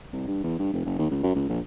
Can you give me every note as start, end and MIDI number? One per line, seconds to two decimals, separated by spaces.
0.13 0.23 36
0.28 0.39 43
0.43 0.58 40
0.59 0.71 43
0.73 0.81 29
0.85 0.99 30
0.99 1.08 39
1.11 1.19 37
1.23 1.33 42
1.35 1.46 37
1.49 1.59 34